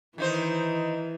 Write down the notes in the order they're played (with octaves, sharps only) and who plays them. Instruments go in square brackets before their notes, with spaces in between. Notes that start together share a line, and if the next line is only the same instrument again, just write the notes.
[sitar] D#3 D#4 C5 [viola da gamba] E3